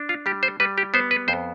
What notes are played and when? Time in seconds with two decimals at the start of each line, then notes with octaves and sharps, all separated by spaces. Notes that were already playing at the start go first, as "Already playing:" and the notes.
Already playing: D4
0.09 F4
0.26 G3 G4
0.43 C5
0.60 G3 B4
0.78 G4
0.94 B3 C5
1.11 B4
1.28 F2 C5